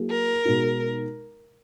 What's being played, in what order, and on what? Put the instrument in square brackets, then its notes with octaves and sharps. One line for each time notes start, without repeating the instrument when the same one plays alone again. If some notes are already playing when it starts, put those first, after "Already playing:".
Already playing: [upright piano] F#3 A#3 E4 G#4
[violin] A#4
[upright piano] B2 G#3 D#4 F#4